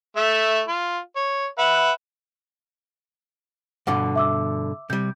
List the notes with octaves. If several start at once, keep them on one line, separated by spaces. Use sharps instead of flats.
A3 E5
F4
C#5
B4 E5 F#5
G2 B2 D3 F#5 D6
E5 D6 E6
C3 G3 G6